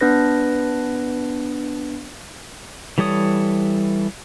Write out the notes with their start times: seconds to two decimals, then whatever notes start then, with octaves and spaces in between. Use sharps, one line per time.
0.01 B3 D4 B4 A#6
2.98 E3 G3 A4 C#5 D#6